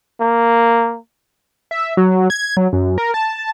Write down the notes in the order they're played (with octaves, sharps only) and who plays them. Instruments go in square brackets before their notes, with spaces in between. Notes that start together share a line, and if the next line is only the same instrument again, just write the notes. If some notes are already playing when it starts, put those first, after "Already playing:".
[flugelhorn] A#3
[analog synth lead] E5
F#3
G#6
F#3
F#2
A#4
A5